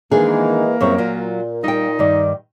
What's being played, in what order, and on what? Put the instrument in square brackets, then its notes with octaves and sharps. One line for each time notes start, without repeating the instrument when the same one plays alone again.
[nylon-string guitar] D#3 D4 G#4 [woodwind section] E3 G#3 [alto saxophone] A#3
[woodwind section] C#2 E4 C#6 [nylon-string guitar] F#2 G3 C4
[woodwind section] A#2 [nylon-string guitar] F#3 F4
[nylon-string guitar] G3 G5 [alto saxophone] D#4
[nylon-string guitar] G2 D#3 [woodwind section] D5